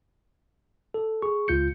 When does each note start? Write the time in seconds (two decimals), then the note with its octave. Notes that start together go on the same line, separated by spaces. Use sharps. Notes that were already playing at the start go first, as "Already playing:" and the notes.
0.94 A4
1.22 G#4 C#6
1.48 C#2 F4 G6 C#7